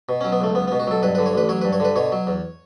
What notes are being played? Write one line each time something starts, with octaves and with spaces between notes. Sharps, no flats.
B2
C#4
F#3
B3
C#2 A3
C#2 B3
B3
B2
F#4
F#3 A4
G2 B4
B4
D3
C#5
A1 B4
F#3 C#5
B4
G2
C#5
D3 B4
B2 C#5
F#3
E2